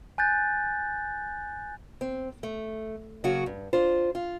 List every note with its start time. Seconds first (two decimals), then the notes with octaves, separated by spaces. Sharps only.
0.18 G#5 F#6 G6 A6
2.01 C4
2.43 A3
3.24 C#3 F#3 A#3 F#4
3.46 G2
3.73 D4 F4 C5
4.15 F4